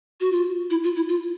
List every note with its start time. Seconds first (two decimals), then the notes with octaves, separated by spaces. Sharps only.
0.21 F#4
0.32 F4
0.70 E4
0.84 F4
0.96 E4
1.08 F4